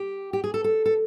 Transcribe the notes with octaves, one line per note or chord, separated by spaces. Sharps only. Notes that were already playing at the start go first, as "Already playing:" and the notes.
Already playing: G4
G4
G#4
A4
A4
A4